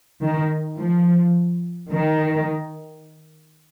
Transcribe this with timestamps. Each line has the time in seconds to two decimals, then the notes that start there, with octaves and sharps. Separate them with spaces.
0.23 D#3
0.79 F3
1.92 D#3